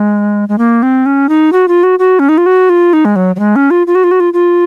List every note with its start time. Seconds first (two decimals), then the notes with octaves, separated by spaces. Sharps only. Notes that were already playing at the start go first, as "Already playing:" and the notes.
Already playing: G#3
0.49 G#3
0.58 A#3
0.83 C4
1.06 C#4
1.29 D#4
1.53 F#4
1.68 F4
1.83 F#4
1.99 F#4
2.19 C#4
2.29 D#4
2.38 F4
2.46 F#4
2.69 F4
2.93 D#4
3.05 G#3
3.16 F#3
3.36 F#3
3.39 G#3
3.56 C#4
3.71 F4
3.87 F4
3.95 F#4
4.04 F4
4.11 F#4
4.20 F4
4.33 F4